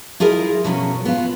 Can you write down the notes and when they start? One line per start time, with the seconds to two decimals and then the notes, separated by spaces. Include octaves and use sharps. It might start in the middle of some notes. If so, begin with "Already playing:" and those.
0.20 E4 F4 G#4 A#4 D#5
0.64 B2 F3 F#3 C#4
1.05 B3 F4